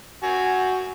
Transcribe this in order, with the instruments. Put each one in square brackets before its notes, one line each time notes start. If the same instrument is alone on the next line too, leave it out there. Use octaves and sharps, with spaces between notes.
[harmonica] F#4 G#5